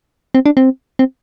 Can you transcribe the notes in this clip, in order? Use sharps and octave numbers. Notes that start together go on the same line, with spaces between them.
C4
D4
C4
C4